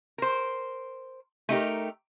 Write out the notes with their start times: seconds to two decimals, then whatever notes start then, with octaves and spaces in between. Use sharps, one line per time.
0.18 A#4 C5
1.49 A3 D#4 G4 A#4